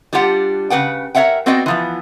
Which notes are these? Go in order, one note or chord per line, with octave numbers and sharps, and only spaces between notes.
G3 D4 F4 G4 F#5
C#3 D4 B4 F#5 G5
A#4 C#5 D#5 E5 F#5 G5
B3 C4 F#4 D5 D#5 G5
E3 F3 B3